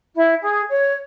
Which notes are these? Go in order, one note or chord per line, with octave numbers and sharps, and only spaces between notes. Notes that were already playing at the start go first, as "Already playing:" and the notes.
E4
G#4
C#5